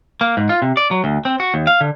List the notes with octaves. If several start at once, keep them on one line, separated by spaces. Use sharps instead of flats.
A#3
G#2
F4
C3
D5
F#3
D2
C4
F#4
D#2
F5
D3